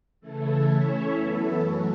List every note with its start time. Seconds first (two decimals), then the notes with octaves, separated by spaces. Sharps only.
0.21 C#3 E3 A3 E4 A4
0.67 A3 C#4 E4 C#5 E5
1.14 F#2 E3 B3 E4 A4
1.60 F#3 A3 C#4 F#4